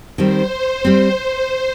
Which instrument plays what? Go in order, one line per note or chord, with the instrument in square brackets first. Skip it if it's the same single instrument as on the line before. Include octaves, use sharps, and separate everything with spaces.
[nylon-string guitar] D#3 G3 C4 [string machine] C5
[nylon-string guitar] G3 C4